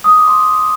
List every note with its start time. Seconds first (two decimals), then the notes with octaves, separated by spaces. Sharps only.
0.04 D#6
0.16 D6
0.27 C6